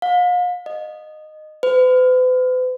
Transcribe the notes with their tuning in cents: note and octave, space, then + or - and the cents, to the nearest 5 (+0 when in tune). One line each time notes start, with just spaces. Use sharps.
F5 +40
D#5 -15
B4 +45